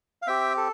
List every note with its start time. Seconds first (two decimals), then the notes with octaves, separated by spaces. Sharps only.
0.22 F5
0.27 C4 G4 E5 G5
0.57 A4